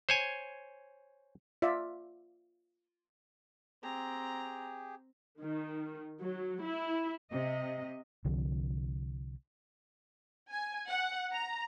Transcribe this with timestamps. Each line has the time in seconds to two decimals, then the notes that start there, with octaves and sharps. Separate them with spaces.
0.09 C5 C#5 G#5
1.62 F4 D5 E5
3.83 C4 G4 G#4 A#5
5.40 D#3
6.20 F#3
6.61 E4
7.32 C3 D#5
8.25 C2 D3 F3 C4
10.51 G#5
10.89 F#5
11.33 A#5